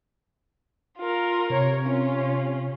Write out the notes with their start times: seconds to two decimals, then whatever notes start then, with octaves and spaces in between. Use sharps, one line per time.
0.98 F4 A#4
1.50 C3 A#4 C#5
1.84 C#4 F4